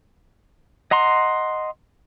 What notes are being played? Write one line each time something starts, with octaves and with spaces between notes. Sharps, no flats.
D#5 F#5 A#5 C6